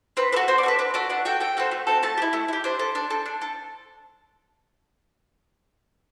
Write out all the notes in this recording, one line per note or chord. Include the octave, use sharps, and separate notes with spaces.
C4 B4
F#4 A4 B4
C4 C5
D5
F#4
A4 B4
D4 B4
F#4 A4 D5
D4 F#5
F#4 A4 G5
A3 G5
C4 F#4 A4
A3
C4 F#4 A4
A3 A5
G4
E4
A3
E4
G4
D4 C5
A4
D4
A4
D4
A4